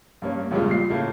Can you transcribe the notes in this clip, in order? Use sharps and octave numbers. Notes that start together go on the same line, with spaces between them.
G2 A#3 C#4
E2 G2 A#2 C#3 G3 G#3
A#2 C7
A2 C#3 A3 A#3